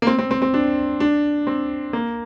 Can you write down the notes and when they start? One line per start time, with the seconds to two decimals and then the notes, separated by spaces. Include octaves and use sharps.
0.02 A#3
0.07 C4
0.18 C4
0.31 C4
0.42 C4
0.54 D4
1.00 D4
1.47 C4
1.93 A#3